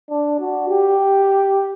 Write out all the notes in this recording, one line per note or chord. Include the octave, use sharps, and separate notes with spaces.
D4
F#4
G4